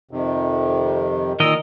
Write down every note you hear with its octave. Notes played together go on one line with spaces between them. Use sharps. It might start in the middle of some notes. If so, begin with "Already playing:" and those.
F2 C3 D#3
A#2 D#3 A#4 D#5 E6